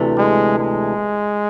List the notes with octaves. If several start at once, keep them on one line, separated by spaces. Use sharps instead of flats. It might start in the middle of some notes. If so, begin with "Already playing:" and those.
Already playing: D2 C3 E3 A3
G#3
G#3